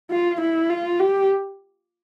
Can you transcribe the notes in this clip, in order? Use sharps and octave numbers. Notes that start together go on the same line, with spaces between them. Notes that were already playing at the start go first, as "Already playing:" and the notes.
F4
E4
F4
G4